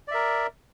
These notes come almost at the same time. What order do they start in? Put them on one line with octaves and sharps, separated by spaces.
D5 E5 A#4